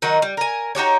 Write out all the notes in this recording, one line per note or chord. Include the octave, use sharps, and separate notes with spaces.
D#3 F#3 D#4 F#4
G3
A#4 G#5
D#4 F#4 G4 C#5